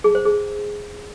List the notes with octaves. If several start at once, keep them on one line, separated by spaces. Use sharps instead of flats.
G#4
C5
G#4